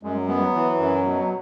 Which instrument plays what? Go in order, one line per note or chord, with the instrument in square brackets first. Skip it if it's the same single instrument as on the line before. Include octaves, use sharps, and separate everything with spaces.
[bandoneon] F#2 [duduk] G#3
[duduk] F#3
[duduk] G#3 [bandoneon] B3
[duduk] F#3
[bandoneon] E3
F#2
B2